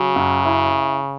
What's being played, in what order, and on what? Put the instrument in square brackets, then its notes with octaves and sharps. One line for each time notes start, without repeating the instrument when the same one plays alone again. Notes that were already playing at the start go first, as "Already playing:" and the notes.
Already playing: [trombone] C#3 [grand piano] F#3
[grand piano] F#2
E4